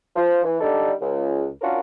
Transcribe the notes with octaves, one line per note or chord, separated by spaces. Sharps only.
F3
E3
D3 G3 D4 D#4 A4 D5
C#2
C#4 D4 F4 F#4 A#4